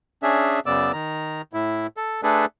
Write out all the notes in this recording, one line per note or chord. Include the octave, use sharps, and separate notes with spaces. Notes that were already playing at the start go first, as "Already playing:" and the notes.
C#4 D4 G#4 E5
F#2 C#3 B3 D5 D6 E6
D#3 A#5
A2 E4
A4
A3 D4 G#4 A4 B4